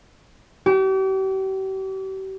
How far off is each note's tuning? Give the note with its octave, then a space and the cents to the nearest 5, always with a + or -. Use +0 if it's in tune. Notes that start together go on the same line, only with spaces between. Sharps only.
G4 -40